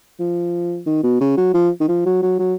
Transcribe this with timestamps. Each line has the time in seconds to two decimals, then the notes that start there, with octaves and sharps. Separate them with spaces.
0.20 F3
0.87 D#3
1.04 B2
1.21 C#3
1.37 F#3
1.54 F3
1.80 D#3
1.89 F3
2.06 F#3
2.23 F#3
2.39 F#3